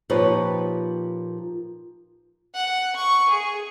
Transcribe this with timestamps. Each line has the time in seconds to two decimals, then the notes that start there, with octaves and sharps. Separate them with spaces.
0.10 A#2 F3 D#4 G4 B4 C#5
2.54 F#5
2.96 C#6
3.29 G#4